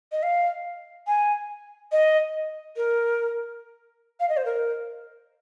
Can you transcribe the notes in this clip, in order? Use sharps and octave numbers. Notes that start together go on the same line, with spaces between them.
D#5
F5
G#5
D#5
A#4
F5
D#5
C5
A#4